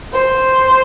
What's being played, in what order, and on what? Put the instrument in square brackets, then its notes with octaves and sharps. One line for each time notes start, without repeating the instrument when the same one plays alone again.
[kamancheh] C5